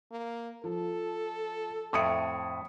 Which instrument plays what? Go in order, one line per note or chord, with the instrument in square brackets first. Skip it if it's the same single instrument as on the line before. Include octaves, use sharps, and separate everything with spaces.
[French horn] A#3
[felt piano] F3 [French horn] A4
[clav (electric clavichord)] F2 A2 [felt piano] E5 D#6 C#7